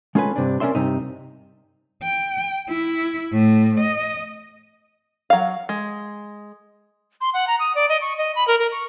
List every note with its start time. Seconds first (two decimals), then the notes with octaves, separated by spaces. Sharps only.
0.15 G#3 C#4 F4 A4 B4 G#5
0.36 G2 C3 D4
0.60 C#4 A#4 D5 E5 C6
0.75 G2 C3 D#4
2.03 G5
2.70 E4
3.33 A2
3.81 D#5
5.30 F#3 F5
5.69 G#3
7.21 C6
7.34 F#5
7.48 A#5
7.59 D#6
7.75 D5
7.89 D#5
8.01 C#6
8.18 D#5
8.35 B5
8.48 A#4
8.59 A#4
8.72 C#6